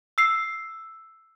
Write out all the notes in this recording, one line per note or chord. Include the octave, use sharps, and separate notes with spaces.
E6 C7